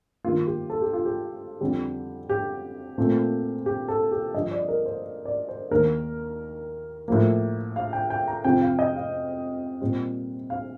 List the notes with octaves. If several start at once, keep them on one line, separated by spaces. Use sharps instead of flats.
G2 D#3 A#3 F4
G4
A4
G4
F4
G4
F2 D3 G3
G4
A#2 A3 C4
G4
A4
G4
G2 D3 F3 D#5
D5
A#4
C5
D5
C5
D#2 D#3 A#3 A#4
A2 F3 A#3
F5
G5
G5
A#5
F2 C3 F3 C4 G5
F5
D#5
F5
A#2 G3 C4
F5